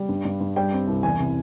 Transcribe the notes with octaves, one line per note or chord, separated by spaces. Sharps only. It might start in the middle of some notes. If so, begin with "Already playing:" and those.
Already playing: G3
G2
G2
G2
G3 G5
C4
C2
E2 G#5
C3